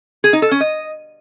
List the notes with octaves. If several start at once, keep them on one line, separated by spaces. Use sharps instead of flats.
G#4
D#4
A4
C#4
D#5